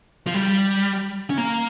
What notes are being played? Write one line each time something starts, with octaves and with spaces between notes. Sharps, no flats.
F3
G3
C#4
A#3